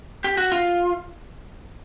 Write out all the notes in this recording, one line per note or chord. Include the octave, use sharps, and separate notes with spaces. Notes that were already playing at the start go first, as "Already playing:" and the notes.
G4
F#4
F4